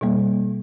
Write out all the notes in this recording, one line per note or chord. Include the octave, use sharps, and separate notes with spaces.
B2 G3 A#3